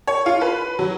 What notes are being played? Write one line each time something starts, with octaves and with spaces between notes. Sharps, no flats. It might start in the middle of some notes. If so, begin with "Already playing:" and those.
C#5
F4
B4
F#3